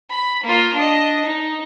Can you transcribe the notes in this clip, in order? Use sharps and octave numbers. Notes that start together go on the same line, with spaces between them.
B5
A#3 F4
D4 D#5
D#4